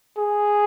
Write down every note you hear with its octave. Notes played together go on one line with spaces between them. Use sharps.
G#4